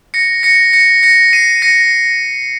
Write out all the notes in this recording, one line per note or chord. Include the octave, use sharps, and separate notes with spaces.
A#6 C#7
A#6 C#7
A#6 C#7
A#6 C#7
C7 D#7
A#6 C#7